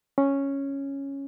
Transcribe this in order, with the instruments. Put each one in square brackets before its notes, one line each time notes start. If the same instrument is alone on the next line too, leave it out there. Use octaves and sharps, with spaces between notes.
[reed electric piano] C#4